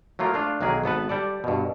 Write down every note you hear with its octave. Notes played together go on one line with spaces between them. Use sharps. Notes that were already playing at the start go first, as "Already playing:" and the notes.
F#3 A3 A#3 F4
A3 D4 F4
B1 D#3 F#3 A#3 G#4
G#1 B3 A4 B4
G3 A4 D5
G2 B2